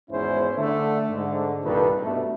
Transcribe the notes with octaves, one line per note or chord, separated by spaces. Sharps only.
G#1 E2 G#2 C#4 E4 C5
D3 A3
G#2 D3
C2 G2 A#2 D#3 A4 B4
G2 B2 A3